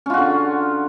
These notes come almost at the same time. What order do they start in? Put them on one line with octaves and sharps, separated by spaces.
C#4 F4 F#4 D3